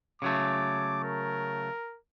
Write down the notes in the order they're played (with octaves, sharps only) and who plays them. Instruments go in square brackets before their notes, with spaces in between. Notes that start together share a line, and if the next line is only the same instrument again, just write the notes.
[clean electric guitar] C#3 F#3 A3 [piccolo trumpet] D6
[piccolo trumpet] A#4